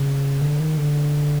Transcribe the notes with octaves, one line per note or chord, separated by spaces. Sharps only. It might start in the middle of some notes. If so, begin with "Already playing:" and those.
Already playing: C#3
D3
D#3
D3